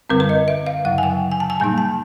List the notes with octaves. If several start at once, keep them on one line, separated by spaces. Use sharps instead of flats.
F#2 D3 G3 C4 A#4
B4
D#5
E5
F5
F#2 C#3 F#3 F#5
G#5
G5
G#5
A5
G#5
A#2 G3 A#3 D#4 G#5
A5